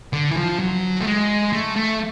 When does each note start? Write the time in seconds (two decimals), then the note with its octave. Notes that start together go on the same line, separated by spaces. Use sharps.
0.13 D3
0.31 E3
0.37 F3
0.59 F#3
1.00 A3
1.07 G#3
1.53 A3
1.76 A3